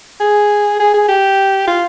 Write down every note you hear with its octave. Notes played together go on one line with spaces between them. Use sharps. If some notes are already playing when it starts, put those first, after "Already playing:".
G#4
G#4
G#4
G4
F4